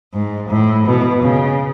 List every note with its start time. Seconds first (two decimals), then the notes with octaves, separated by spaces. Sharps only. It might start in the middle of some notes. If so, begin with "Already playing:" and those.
0.14 G#2
0.50 A2
0.86 B2
1.23 C#3